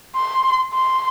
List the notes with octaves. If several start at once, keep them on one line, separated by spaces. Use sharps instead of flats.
C6
C6